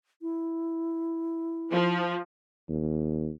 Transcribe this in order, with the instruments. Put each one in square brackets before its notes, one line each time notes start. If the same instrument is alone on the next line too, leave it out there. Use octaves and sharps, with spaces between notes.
[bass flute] E4
[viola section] F3
[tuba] D#2